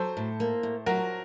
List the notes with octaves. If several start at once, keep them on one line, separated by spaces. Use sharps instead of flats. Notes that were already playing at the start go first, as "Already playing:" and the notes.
Already playing: F#3 A4 C5
A2
A#3
A2
F#3 F#4 A#4